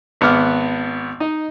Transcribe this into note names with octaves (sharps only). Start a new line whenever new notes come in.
G#1 B3 F#5 D6 F6
D#4 D#5